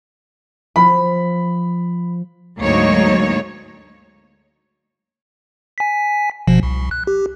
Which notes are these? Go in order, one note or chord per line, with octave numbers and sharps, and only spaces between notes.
F3 B5
D2 G#2 F#3 A#3 D#4 C#5
G#5 B6
G1 B2 F3
C2
F#6
G4